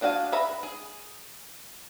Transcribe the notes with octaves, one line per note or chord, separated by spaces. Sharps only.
G#3 D4 F#4 F5 G#5
B4 E5 A#5 B5
G#4